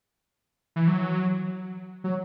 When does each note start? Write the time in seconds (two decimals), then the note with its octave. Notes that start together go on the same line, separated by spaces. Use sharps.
0.76 E3
0.88 F#3
2.04 F#3